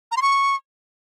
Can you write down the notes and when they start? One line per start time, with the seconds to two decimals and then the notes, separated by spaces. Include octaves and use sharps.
0.11 A#5
0.17 C6
0.22 C#6